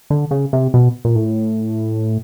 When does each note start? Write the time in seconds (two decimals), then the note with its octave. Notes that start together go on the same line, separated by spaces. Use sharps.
0.10 D3
0.31 C#3
0.53 C3
0.74 B2
1.05 A#2
1.15 A2